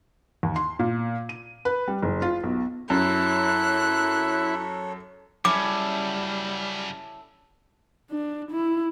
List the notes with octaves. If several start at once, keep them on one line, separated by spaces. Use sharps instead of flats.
D#2
C6
A#2
D#7
B4
G3
F#1
F4
B1
F#2 E4 A4 C#5 F#6
F#2 C#3 G3 C#4 E4 A4 D6
D4
E4